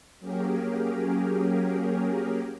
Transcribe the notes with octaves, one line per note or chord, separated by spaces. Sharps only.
F#3 A#3 C#4 G4 G#4 A#4